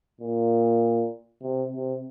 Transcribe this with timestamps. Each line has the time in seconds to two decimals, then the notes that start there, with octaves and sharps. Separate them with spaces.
0.21 A#2
1.43 C3
1.73 C3